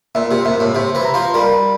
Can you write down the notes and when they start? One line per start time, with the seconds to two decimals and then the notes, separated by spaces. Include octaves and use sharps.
0.15 A#2 E5
0.31 C3
0.45 A#2 E5
0.60 A2
0.75 C3 E5
0.95 E3
1.05 A#5
1.14 F3
1.34 G3 A#4